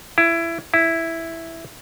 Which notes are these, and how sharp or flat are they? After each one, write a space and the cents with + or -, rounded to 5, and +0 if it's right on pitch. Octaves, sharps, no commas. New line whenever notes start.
E4 +20
E4 +0